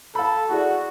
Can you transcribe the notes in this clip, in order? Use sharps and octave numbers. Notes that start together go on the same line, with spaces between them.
A4 F5 B5
E4 F#4 G#4 D5